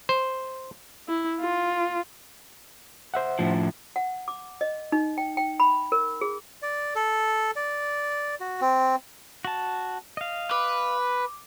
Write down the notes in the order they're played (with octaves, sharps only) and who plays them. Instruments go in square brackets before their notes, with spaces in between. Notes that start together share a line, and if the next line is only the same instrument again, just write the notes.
[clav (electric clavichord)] C5
[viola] E4
F4
[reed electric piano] C5 E5 F#5
[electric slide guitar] A2 F3
[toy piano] F#5
D6
D#5
D#4
G5
G5
B5
A#4
G#4
[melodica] D5
A4
D5
F#4
C4
[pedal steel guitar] F#4 A5
D#5 F5
[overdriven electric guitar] B4 [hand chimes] D6